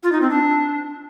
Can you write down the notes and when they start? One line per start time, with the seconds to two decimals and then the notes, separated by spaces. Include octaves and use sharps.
0.03 F4
0.12 D#4
0.21 C4
0.30 D4